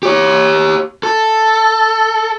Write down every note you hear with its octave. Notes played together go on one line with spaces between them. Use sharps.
G4 C#5
A4